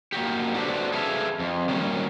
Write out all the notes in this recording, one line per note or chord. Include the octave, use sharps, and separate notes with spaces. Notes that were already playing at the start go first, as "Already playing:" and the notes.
A#3 F#4 G4
D4 F#4 A4 B4 C5 D5
G#4 A4 B4 E5 F5
F2
D#3 F#3 G3 A#3 C#4